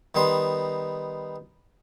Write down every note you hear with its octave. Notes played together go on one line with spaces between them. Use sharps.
D#3 G3 B3 D#4 C6